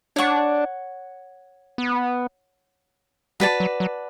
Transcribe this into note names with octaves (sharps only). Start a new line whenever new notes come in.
D4 C#5 F#5 C#6
B3
G3 F#4 B4 D5 A5
F#3
F#3